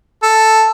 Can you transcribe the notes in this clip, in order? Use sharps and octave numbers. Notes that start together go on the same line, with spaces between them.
A4